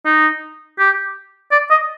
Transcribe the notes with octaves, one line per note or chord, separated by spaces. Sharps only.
D#4
G4
D5
D#5